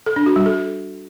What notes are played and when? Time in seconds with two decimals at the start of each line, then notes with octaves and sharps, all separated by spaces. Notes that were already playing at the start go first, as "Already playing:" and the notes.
0.06 A4
0.16 D4
0.26 F#4
0.36 G3
0.46 A4